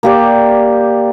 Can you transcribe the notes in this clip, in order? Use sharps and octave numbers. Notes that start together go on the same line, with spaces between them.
A#3 G4 D5